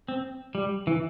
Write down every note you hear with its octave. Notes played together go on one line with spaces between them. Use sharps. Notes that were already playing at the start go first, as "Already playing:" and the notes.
C4
G3
E3